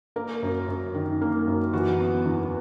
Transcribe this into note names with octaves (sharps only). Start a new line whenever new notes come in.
A#3 A#4
F#2
F#2
D#3
A#3
F#2
E3 F#4
B3
E2